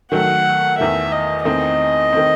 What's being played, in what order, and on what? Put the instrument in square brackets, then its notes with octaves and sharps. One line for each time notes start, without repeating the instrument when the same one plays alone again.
[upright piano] D#3 F#3 A3 [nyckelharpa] F#5
[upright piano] E2 D#3 A3 [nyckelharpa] E5
[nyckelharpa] D#5
[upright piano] E2 D#3 A3 C4 D#4 [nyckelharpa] D#5
[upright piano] D#3 A3 C4